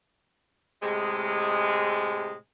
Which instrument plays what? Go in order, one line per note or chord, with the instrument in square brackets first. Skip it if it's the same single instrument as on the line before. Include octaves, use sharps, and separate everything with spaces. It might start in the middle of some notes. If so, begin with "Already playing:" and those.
[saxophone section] A2 C3 G#3